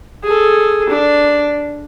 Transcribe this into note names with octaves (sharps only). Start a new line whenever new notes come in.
G#4 A4
D4